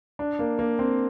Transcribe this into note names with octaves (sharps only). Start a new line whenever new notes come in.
D4
A#3
A#3
C4